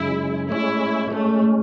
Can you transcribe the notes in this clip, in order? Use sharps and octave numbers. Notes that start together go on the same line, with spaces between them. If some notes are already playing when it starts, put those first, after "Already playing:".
Already playing: F#2 C#3 G#3 E4
A2 G#3 C#4 E4
A2 G#3 A3 C#4